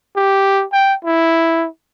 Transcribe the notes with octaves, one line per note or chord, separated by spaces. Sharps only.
G4
G5
E4